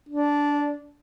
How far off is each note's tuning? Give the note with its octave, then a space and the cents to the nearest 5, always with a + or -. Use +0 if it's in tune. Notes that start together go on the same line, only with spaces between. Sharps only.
D4 -10